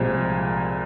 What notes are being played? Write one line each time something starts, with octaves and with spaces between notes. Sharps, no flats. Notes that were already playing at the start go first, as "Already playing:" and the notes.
Already playing: C2 A#2 F3 G#3 C4